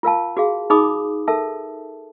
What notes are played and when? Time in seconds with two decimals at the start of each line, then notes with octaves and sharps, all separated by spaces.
0.03 F4 A#4 F5 A5
0.37 F#4 G#4 F5
0.70 D#4 G#4 B5 D6 D#6
1.28 A4 A#4 E5 A5